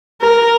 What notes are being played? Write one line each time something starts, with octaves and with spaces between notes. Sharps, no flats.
A#4